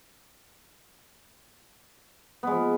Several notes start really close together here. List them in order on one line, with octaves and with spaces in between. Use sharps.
B3 G#3 F3